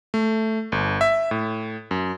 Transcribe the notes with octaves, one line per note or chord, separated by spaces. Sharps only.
A3
G1
E5
A2
F#2